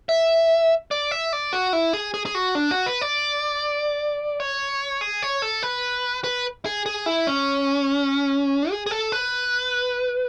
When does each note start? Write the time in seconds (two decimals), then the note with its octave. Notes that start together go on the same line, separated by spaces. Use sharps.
0.09 E5
0.91 D5
1.11 E5
1.33 D5
1.53 F#4
1.73 E4
1.93 G#4
2.14 G#4
2.26 G#4
2.35 F#4
2.55 D4
2.71 F#4
2.86 B4
3.01 D5
4.40 C#5
5.01 G#4
5.22 C#5
5.42 A4
5.63 B4
6.24 B4
6.66 G#4
6.86 G#4
7.06 E4
7.27 C#4
8.70 G#4
8.86 G#4
8.91 A4
9.12 B4